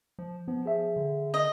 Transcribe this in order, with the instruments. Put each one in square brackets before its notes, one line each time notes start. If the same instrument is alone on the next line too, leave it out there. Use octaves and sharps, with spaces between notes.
[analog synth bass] F3
[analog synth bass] F3 [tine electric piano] B3
[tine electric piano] G#4 E5
[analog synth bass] D3
[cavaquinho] D#5